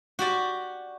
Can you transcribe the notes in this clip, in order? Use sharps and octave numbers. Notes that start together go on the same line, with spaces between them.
F#4 G4 D5